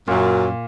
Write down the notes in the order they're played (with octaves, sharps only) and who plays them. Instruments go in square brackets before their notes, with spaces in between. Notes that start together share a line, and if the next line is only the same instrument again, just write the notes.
[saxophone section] F#2 [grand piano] A#2